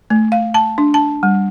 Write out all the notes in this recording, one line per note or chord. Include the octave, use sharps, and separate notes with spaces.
A3
F5
A5
D4
A5
G3